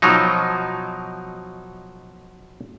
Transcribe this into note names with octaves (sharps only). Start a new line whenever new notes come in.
B2 F3 F#3 D#4